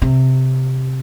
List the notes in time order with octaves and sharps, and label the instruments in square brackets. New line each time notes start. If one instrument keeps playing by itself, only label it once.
[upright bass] C3